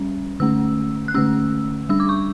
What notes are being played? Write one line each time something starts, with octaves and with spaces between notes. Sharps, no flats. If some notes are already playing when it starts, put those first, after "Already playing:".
Already playing: G3 C#4
D3 A3 C#4 E6
F#6
D3 A3 C#4 E6
G3 D4 E6
D6
C#6